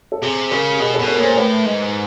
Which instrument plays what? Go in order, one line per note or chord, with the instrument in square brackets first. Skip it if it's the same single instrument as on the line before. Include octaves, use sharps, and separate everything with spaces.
[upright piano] A4
[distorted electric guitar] C3 [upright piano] G#4
[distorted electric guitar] C#3 [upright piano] A#4
[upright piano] G4
[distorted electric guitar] B2 [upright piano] G#4
[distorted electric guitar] B2 [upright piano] A4
[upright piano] A#4
[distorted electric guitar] A#2 [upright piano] C#5
[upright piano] C5
[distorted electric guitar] A2 [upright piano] B4
[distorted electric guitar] G#2